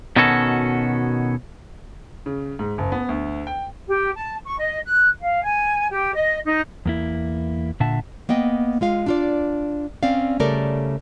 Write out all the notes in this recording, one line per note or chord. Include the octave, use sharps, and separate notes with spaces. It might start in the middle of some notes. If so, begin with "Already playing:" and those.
B2 D#3 B3 C#4 F#4 A4
C#3
G#2
F#1
B3
D2
G5
G4
A5
C#6
D#5
F#6
F5
G#5
G4
D#5
D#4
E2 A#3 E4
A#2 D3 E5 F#5 A5
A#3 B3 D#5 G5
G#3 F4 F5
D4 F4 D5
C4 C#4 D5 F5
C#3 G3 A3 A4 A#4 D5